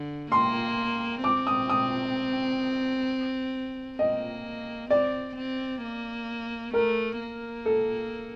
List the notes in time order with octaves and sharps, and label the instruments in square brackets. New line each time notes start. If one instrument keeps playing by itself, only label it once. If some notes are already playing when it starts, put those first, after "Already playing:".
Already playing: [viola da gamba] D3
[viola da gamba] A#3 [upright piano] C6
[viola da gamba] C4 [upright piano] D6
[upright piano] D#6
D#6
[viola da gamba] A#3 [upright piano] D#5
[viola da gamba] C4 [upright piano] D5
[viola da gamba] C4
A#3
[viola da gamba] A3 [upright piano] A#4
[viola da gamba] A#3
[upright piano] A4